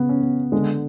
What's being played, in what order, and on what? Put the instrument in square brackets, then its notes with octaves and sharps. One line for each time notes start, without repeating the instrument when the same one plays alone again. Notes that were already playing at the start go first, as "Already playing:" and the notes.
Already playing: [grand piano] C#3 B3
[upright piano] C#4
[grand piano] B3
[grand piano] D3 [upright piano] G#3